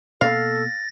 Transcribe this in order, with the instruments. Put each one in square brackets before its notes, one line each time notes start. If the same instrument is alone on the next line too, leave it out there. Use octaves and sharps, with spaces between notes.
[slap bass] B2 A#3 [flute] A4 [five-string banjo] F5 [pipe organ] A6 A#6